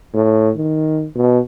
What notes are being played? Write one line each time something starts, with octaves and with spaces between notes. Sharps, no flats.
A2
D#3
B2